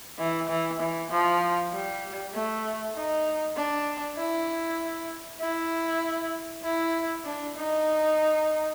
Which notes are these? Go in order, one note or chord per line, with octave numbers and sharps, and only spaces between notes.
E3
E3
E3
F3
G3
A3
D#4
D4
E4
E4
E4
D4
D#4